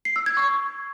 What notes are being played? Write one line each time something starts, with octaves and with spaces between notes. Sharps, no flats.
C7
E6
G#6
C#6